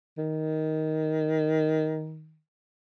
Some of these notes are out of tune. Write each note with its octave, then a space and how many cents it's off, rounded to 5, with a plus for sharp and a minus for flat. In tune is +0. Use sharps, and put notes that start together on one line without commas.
D#3 +10